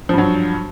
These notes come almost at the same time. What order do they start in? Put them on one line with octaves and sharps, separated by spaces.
F3 G2 F#3